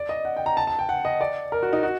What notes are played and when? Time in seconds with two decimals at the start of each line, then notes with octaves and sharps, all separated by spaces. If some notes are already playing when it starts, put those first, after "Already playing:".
Already playing: D5
0.09 D#5
0.25 F#5
0.36 G5
0.46 A#5
0.57 A5
0.67 A5
0.79 G5
0.89 F#5
1.05 D#5
1.21 D5
1.52 A#4
1.63 F#4
1.73 D#4
1.83 F#4